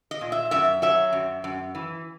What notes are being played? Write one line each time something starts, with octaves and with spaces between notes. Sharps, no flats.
D#5
A#2
E5
F#2 E5
F#3 E5
F#2
F#2
E3